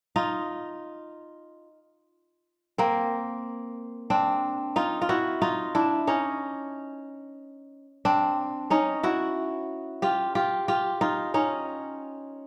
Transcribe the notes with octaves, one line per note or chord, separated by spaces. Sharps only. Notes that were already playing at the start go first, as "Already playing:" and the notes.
D#4 F4
A#3 C4
C4 D4
D#4 F4
F4
E4 F#4
D#4 F4
D4 E4
C#4 D#4
C4 D4
C#4 D#4
E4 F#4
F4 G4
F4 G4
F4 G4
D#4 F4
C#4 D#4